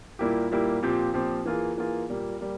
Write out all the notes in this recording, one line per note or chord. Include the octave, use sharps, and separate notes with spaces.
A#2 G3 A#3 E4 G4
A#2 G3 A#3 E4 G4
A#2 F3 C4 G4
A#2 F3 C4 G4
E3 A#3 F4 G#4
E3 A#3 F4 G#4
A#2 G3 A#3
G3 A#3